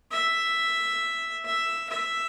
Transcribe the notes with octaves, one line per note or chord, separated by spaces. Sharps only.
E5
E5
E5